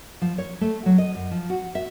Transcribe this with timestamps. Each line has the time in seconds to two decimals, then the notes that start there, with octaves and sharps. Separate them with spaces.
0.22 F3
0.38 C#5
0.61 A3
0.86 F#3
0.98 D#5
1.15 F#2
1.31 F3
1.50 F#4
1.75 E5